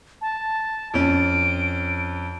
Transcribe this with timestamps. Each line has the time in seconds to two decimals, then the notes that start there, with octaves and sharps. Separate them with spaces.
0.22 A5
0.94 F2 C#4 D7